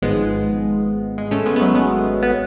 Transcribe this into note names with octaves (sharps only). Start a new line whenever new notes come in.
G#1 G#2 F3 G#3 B3
G#3
A3 C#4
G#3 B3
B3
F#3 A3
G#3 B3
B3